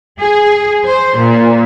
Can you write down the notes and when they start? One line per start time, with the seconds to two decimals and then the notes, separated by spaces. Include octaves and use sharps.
0.20 G#4
0.84 C5
1.18 A#2